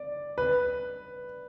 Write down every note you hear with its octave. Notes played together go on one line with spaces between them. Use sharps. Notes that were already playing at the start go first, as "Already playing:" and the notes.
Already playing: D5
B4